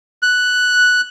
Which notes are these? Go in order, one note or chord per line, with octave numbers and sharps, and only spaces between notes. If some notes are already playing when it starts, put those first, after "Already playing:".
F#6